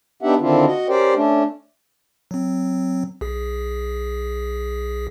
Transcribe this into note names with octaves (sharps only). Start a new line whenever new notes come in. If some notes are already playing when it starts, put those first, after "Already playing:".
B3 D4 D#4 G4 E5 F#5
D3 D#3 C4 D4 E4 F4
F#4 D#5
C#4 G4 A#4 C5 D5 G5
A3 C#4 D4
F#3 C4
B1 G#4